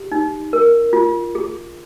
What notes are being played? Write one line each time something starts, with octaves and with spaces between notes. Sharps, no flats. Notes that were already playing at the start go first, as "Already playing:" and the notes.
Already playing: G4
D#4
A#4
F4
G#4